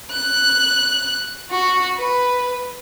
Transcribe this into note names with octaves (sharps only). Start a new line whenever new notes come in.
F#6
F#4
B4